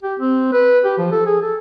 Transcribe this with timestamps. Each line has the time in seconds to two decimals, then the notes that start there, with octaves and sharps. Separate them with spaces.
0.02 G4
0.20 C4
0.53 B4
0.84 G4
0.98 F3
1.12 A4
1.26 G#4
1.42 A4